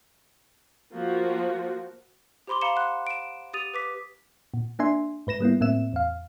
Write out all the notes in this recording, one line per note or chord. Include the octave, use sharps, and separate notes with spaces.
F3 A#3 F#4
G4 C5 B5 C6 D6 G7
F5 A#5 B5 C#7 E7 G7
F#5 C6 F#6
D7 E7
G4 D#6 A6 D#7 F7
B4 D6 B6
A#2
A#3 D4 E5 G#5 C6
G#2 B4 A#6 E7
G3 A#3 B3 E4
A2 A#3 C4 E5 E7
E2 F5